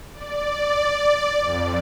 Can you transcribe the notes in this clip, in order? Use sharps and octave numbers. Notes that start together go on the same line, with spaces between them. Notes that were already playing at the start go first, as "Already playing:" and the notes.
D5
F2